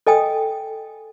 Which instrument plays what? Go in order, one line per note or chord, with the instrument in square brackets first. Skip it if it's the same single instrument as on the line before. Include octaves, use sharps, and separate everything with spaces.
[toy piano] A4 D#5 G5 G#5 D#6